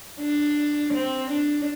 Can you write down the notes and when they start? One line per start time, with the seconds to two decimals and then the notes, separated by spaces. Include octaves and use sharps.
0.20 D4
0.94 C4
1.31 D4